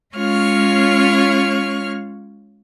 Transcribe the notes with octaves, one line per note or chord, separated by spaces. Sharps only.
G#3 C#4 F4 C#5 C#6 F6